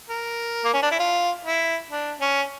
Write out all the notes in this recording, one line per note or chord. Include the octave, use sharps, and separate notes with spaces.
A#4
A#3
C#4
D4
E4
F4
E4
D4
C#4